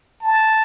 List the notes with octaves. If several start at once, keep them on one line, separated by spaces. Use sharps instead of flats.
A5